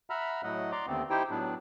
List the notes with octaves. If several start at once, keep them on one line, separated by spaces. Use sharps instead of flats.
E5 F#5 A#5 B5 E6 F6
A2 F#3 A3 D#5 F#5
D5 A#5 C6 D6
D#2 D3 A3 B3 C4
D#4 E4 G4 C5 G5
A2 F#3 B3 D4